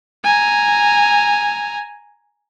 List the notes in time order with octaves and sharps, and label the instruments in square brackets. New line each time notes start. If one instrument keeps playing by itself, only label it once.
[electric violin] G#5 A#5